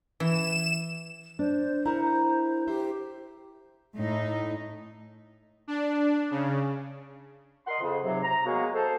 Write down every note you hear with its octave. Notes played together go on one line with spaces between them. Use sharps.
E3 E7
D4 C5
E4 A#4 F#5 A#5
G4 C5 E5
A2 D#4
D4
C#3
A#4 D#5 F#5 C6
F2 C#3
G#2 C3 F#3
A#5
F#3 G#3 A#3 B3 F#4 G#4
A4 C5